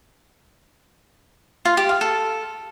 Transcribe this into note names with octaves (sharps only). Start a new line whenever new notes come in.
F4
G4
F5
A4